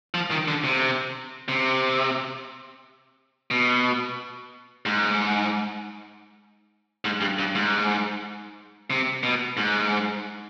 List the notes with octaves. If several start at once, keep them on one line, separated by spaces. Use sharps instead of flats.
F3
D#3
D3
C3
C3
B2
G#2
G#2
G2
G2
G#2
C3
B2
G#2